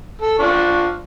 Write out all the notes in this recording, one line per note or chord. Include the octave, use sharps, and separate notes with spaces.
A4
F3 D4 C#6